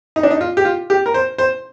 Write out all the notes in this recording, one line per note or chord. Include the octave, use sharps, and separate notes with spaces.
D#4
D4
D#4
F4
G4
F4
G4
A#4
C5
C5